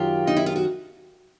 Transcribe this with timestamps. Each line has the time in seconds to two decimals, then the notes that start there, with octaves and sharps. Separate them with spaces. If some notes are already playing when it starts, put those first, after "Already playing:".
Already playing: F#2 D#3 F4 G4
0.27 D#4
0.36 E4
0.46 F4
0.56 F#4